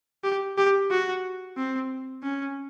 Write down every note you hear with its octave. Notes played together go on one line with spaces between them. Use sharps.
G4
G4
F#4
C4
C#4